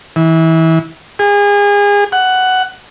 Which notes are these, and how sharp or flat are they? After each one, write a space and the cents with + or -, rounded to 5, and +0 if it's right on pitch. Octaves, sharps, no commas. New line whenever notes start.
E3 -25
G#4 -30
F#5 +10